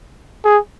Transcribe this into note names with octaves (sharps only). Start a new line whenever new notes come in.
G#4